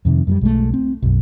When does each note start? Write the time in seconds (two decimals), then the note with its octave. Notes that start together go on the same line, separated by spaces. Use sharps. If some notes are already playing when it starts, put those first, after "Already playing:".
0.05 F2 C3 D#3
0.27 F#2 F#3 G3
0.41 B1 G#3 A3
0.74 C4
1.02 B1 F#2